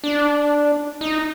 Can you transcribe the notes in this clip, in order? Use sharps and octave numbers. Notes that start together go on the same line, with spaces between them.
D4
D#4